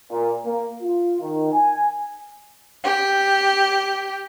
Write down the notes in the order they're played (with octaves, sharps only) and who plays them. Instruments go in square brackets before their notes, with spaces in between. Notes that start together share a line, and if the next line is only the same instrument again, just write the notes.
[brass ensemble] A#2
A#3
F4
D#3
G#5
[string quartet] G4